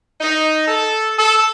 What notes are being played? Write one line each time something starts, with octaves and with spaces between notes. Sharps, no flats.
D#4
A4
A4